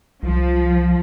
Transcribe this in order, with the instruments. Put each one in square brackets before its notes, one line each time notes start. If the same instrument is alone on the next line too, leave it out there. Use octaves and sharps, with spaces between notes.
[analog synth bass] C2 [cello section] F3